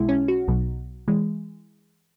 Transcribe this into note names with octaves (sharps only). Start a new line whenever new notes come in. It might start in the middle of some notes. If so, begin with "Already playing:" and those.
Already playing: B1 B2 G#3 E4
C#4
F#4
B1 B2 F#3
E3 G#3